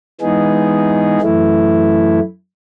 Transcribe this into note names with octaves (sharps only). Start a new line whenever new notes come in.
E3 G#3 B3 D#4 G#4
F#2 E3 A3 E4